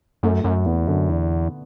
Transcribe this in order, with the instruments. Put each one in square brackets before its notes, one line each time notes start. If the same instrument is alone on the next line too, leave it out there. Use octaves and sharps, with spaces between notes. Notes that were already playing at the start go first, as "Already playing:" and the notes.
[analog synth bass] F#2 [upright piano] A3
[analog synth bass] F#2 [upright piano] A3
[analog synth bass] E2 [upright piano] B3
[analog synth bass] F#2 [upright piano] D3
[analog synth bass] E2 [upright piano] D3